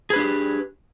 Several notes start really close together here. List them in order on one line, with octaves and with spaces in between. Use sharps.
G#4 B4 D4 G4